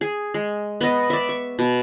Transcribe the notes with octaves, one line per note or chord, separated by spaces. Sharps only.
G#4
G#3
B3 D#5
D5 E5
C#6
B2